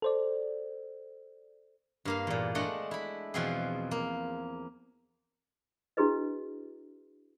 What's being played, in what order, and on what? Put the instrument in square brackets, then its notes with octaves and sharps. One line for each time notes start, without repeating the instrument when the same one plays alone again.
[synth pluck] A4 C5 D5
[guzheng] G2 A#3 F5
E2 A#2
G#3 A3 D4 D#5 F#5
E4 B5
E2 B2 F3 C4 F4 G#4
A#3
[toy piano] D4 E4 F#4 G#4 B4 D#5